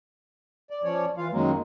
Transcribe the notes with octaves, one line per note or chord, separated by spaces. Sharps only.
D5
F3 C#4 C#5 D5
E3 F4 F5
F#2 D#3 F#3 G#3 A#3